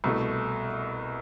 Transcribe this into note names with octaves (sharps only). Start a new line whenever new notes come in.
C2 B2 A3